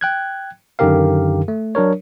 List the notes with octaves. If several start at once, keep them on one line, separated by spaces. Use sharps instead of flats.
G5 F#6 G#6
F#2 D3 D#3 G4 A#4 F5
A3
F#3 D4 A#4 C#5